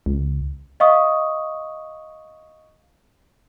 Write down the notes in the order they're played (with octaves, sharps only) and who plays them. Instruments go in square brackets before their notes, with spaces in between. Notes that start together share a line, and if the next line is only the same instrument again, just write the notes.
[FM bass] C#2
[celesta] D#5 F5 C#6 D#6